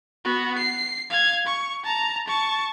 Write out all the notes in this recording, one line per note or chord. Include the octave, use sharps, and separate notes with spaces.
B3 F#4
C7
F5 G#6
C#6
A5 A#5
A5 C#6